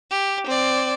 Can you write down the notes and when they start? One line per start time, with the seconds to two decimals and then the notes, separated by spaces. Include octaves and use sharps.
0.11 G4
0.47 C4 D5